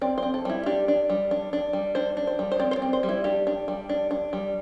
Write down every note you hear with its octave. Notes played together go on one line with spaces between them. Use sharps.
C4 D5
C5
C4
A4
G3 E4
D4 G4
D4
G3
D4
D4
G3
D4 C5
D4
C5
G3
C5
C4 D5
C5
D5
C4
C5
G3
E4
D4 G4
D4
G3
D4
D4
G3